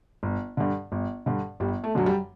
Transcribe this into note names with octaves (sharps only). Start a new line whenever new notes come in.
G1
G2 D3
G1
G2 D3
G1 G3
A3
F#2 D3 F#3
G3